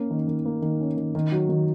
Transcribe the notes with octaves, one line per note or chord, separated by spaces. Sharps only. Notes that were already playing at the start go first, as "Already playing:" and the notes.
Already playing: A#3 C#4
D#3
D#3
A#3
D#3
C#4
D#3
D#3
F#3
D#3